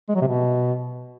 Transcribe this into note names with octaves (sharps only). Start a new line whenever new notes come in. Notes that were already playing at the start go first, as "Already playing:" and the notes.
G#3
F#3
C3
B2